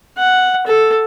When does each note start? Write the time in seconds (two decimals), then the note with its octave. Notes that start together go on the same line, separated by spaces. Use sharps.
0.18 F#5
0.66 A4